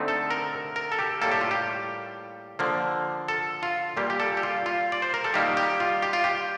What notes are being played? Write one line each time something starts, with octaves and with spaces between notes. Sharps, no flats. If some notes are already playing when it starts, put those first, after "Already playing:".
Already playing: D3 A3 C4 D#4
A4
A#4
A#4
A4
G4
A2 G3 A#3 A4
G4
F4
G4
D3 F3 A#3
A4
F4
A#2 G3 A#3 G4
G4
A4
G4
F4
F4
D5
C5
A#4
A4
D#3 G3 A#3 D#4 G4
G4
F4
G4
F4
G4